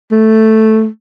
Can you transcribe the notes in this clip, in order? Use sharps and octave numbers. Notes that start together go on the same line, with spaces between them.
A3